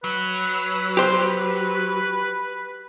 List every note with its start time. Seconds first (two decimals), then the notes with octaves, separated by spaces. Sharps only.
0.04 F#3 B4
0.97 G4 C5